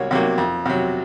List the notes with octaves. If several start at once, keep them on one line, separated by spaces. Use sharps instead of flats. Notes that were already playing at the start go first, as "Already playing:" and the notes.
Already playing: C2 C3 F#3 A#3 C#5
C3 F#3 A#3
F2
C3 F#3